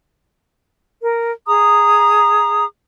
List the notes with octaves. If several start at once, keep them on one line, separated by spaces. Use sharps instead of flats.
A#4
G#4 A#5 D#6